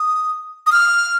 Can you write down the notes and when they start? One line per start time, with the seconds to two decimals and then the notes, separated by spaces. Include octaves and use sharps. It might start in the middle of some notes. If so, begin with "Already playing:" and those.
Already playing: D#6
0.67 D#6
0.72 F6